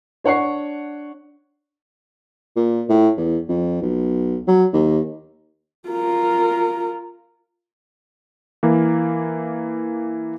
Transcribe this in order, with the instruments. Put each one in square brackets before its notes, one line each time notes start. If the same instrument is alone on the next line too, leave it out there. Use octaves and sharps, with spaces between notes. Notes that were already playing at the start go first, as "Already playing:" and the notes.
[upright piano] D4 C#5 F#5 C#6 C7
[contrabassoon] A#2
A2
E2
F2
B1
F#3
D#2
[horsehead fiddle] F4 A#4
[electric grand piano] E3 A#3